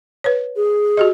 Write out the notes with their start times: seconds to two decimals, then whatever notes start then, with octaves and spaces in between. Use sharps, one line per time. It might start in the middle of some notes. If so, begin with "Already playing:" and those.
0.24 B4 C#5
0.56 G#4
0.97 F#4 G4 D#5